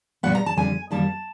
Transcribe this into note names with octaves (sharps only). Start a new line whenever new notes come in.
A#2 G3 B3 F#5
A#5
A5
F2 D3 G3 G#5
F#2 D#3 G3 A#3 A5